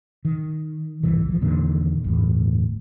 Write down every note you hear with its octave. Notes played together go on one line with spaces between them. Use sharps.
D#3
D1 G1 C2 E3
E3 F3
E2 A#2 D3 D#3
G1 E2 A2